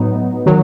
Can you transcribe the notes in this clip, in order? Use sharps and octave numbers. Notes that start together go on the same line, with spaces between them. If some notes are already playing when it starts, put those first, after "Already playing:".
Already playing: A2 F#3 B3 D#4
D#3 F#3